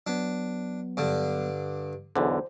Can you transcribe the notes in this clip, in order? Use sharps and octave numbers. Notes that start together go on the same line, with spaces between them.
F#3 B3 D4
G2 D3
B1 E2 D3 C5